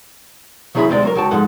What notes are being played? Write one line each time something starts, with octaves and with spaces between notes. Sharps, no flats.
C#3 F#3 E4 G#4 E5 B5
D2 C3 G#3 C4 A4 D5
F#3 F4 A#4
C#2 F#4 G5 A5
G#2 F3 G#3 A4 F#5